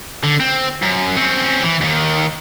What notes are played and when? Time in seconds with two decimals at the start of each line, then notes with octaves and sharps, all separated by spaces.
0.23 D3
0.40 C4
0.82 F#2
1.16 C4 C#4
1.63 E3
1.81 D#2 D#3